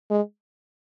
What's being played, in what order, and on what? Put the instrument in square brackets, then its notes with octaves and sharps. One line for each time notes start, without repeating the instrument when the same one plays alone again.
[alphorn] G#3